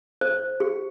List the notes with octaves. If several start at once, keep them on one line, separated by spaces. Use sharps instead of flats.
C5
G4